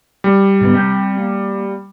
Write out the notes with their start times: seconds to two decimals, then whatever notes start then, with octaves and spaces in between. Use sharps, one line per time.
0.24 G3
0.61 G#2 D3 B3
0.74 C4 G4 G5
1.17 A#3